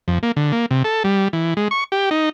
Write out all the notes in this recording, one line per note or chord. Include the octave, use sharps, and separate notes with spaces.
F2
A#3
D3
A#3
C3
A4
G3
E3
G#3
C#6
G4
D#4